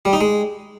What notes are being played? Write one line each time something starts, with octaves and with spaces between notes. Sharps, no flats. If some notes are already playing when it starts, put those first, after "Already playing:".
G3
D#4
G#3